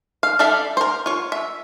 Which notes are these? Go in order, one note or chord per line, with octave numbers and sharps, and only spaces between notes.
F5
G3 D4 A4 E5 F5
A#4 C5
F4 C#5
E5